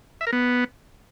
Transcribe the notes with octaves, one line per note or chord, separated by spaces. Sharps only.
E5
A#4
B3